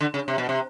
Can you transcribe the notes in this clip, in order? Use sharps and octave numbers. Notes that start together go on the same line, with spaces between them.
D3
C#3
C3
B2
C3